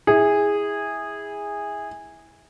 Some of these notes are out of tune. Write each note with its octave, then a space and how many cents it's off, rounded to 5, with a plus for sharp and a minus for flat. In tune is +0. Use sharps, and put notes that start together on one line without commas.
E4 -20 G#4 -15